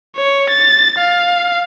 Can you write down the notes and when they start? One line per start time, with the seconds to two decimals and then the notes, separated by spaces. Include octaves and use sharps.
0.16 C#5
0.50 A6
0.98 F5